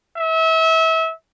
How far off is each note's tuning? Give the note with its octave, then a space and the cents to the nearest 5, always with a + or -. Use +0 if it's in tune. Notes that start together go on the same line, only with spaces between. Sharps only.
E5 -30